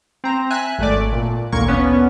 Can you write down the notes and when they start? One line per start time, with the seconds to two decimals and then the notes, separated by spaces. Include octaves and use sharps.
0.24 C4 A#5
0.50 E5 G#5 F#6
0.79 G#1 A3 D5
1.12 A#2
1.52 G#1 D2 A#2 A#3 C#6 G#6
1.68 B3 C#4 D4